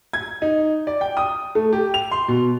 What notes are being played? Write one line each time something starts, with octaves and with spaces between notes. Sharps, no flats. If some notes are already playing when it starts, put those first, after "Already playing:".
G#6
D#4
D5
G5
D#6
A3
G4
F7
C6
B2